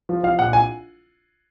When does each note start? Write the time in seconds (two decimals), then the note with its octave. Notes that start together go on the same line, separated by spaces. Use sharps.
0.09 F3
0.23 F3 F5
0.39 A#1 F#5
0.53 G#5